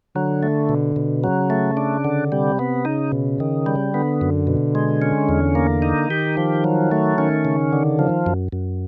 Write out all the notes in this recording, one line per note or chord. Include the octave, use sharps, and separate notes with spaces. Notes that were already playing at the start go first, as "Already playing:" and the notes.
D3 F#3
A3
B2
B2
C#3 F#3
A3
D4
D3
C3 G3
B3
C#3 D#4
B2
D#3
G3
D3 B3
F#2
B2
G#3
C#4
E2
A#3
D#4
D#3 G4
F3
F#3
A3
D#3 C#4
C#3
D3
F3
F#2
F#2